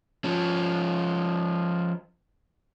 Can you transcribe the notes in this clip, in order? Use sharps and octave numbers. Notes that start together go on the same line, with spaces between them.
F3 C#4